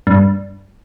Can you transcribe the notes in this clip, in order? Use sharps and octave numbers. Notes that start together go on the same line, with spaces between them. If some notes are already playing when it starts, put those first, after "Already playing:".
G2